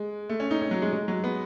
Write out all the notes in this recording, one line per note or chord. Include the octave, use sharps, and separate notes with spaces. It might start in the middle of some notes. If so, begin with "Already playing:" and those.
Already playing: G#3
A3
C#4
D#4
C#4
F#3
G#3
G#3
F#3
B3